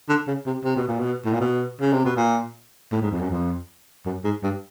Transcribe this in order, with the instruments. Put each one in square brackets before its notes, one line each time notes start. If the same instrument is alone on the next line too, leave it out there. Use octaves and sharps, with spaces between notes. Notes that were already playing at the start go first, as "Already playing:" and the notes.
[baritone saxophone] D3
C#3
C3
C3
B2
A#2
B2
A2
A#2
B2
C#3
C3
B2
A#2
A2
G#2
F2
F#2
F2
F#2
G#2
G2